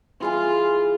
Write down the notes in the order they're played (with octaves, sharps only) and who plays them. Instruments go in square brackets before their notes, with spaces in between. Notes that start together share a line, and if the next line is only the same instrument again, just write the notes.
[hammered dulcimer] E3 G#4 G#5 [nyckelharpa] F4